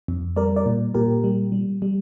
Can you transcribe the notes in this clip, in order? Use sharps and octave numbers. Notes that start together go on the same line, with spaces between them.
F2
G3 A#4 D5
A#4 D5
A#2
A#2 G4 A#4
G3
G3
G3